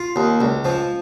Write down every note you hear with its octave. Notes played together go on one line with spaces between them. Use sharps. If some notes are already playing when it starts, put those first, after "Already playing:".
Already playing: F4
D#2
C#2
F3